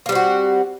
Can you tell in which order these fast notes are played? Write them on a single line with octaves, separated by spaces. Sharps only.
A#3 G3 C4 F#4